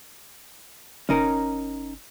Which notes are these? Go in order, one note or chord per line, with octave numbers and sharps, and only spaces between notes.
F#1 C#4 D#4 A#4